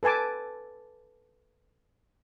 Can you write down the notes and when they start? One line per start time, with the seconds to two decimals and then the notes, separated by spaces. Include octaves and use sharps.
0.03 A4 B4 G#5 A5 D6